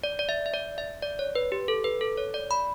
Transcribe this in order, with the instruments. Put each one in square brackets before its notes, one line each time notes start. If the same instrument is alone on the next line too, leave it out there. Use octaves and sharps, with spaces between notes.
[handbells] D5
D5
E5
E5
D5
E5
D5
C#5
B4
G4
A4
B4
A4
C#5
D5
B5